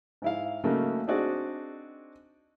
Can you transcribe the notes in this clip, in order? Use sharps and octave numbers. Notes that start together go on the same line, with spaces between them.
G#2 E4 F5
C#3 F#3 A3 A#3 C#4 D#4
C4 D4 D#4 F#4 G#4 D5